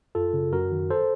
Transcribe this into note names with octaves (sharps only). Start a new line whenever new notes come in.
F#2 F4 A4
C#3
F#2 F#4 A#4
D#3
A4 C5